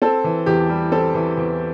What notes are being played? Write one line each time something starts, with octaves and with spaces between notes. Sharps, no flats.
C4 A4
E3
E2 G4
G3
C4 A4
E3
E2